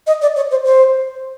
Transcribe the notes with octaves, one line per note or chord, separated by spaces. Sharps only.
D#5
D5
C#5
C5
C5